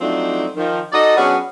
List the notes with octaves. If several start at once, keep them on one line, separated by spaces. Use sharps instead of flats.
F3 F#3 A3 C4 D4 D#4
D#3 F3
D#4 F#4 A4 D5 D#5
F#3 B3 C#4 D4 F#4 G#4